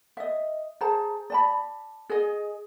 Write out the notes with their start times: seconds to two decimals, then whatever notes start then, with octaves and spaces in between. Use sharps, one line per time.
0.17 D#5 E5
0.81 G#4 C5 A5 A#5
1.30 D5 A5 B5
2.10 G#4 D#5